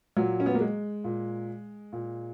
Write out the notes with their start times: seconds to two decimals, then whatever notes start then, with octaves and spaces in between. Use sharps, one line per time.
0.17 A#2 F#3
0.40 C#4
0.46 B3
0.54 A#3
0.60 G#3
1.04 A#2
1.93 A#2